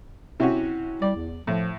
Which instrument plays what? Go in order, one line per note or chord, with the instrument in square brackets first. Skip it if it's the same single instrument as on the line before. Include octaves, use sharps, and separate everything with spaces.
[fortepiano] C3 C#4 F#4 [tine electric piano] E4
[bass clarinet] G3 [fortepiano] D5
[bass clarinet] E2
[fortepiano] A2 [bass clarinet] F3